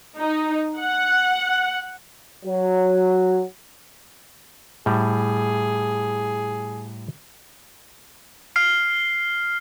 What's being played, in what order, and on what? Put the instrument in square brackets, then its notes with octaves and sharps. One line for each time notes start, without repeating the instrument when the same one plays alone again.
[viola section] D#4
F#5
[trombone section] F#3
[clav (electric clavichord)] A2 G3 [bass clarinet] G#4
[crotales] F6 C7